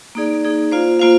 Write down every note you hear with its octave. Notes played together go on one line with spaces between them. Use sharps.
A#3 D#4 G#4 D5
A#3 D#4 G#4 D5
A#3 F4 C5 F5
A#3 F4 C5 F5